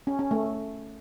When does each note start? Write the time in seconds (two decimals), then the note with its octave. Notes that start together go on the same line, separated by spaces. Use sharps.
0.07 C#4
0.19 C#4
0.31 A3